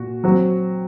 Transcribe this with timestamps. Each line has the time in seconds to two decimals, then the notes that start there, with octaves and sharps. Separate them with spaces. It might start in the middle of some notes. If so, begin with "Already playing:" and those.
Already playing: A#2 F#4
0.24 F#3 C4 F#4